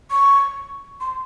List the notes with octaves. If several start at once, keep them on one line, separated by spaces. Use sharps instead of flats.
C#6
C6